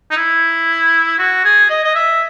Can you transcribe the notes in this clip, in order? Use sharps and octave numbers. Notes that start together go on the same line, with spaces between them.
D#4
E4
F#4
G#4
D#5
D#5
E5